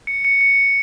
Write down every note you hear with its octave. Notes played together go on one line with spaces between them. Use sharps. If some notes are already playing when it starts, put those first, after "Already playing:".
C#7
C#7
C#7